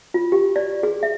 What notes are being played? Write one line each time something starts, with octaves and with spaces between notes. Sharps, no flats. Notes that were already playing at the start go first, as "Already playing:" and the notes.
F4
G4
D5
G#4
E5